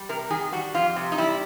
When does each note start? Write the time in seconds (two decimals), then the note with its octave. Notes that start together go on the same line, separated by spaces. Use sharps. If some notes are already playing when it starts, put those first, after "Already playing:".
Already playing: G3
0.09 C3 A#4
0.30 D#3 G#4
0.52 G3 F#4
0.75 F2 F4
0.96 C3
1.12 D#4
1.18 G3 E4